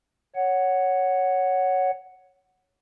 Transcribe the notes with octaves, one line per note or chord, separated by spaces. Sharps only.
C#5 F#5